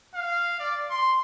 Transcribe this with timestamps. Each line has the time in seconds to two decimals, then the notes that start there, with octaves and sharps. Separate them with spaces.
0.15 F5
0.59 D5
0.90 C6